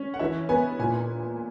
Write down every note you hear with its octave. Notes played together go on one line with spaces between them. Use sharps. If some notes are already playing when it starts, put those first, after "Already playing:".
Already playing: C#4
F#5
E3 E5
B3 G#5
A#2 G#5